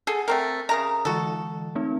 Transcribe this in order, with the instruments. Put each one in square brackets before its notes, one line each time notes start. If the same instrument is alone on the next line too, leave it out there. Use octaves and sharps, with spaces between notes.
[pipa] G#4 A4 [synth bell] F#5 G#5
[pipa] A3 C4 A#4
[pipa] C#3 A#4 A#5 [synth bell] E5 G#5 D#6
[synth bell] D3 E3 G#3 [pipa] F#4 A4
[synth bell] A3 C4 D#4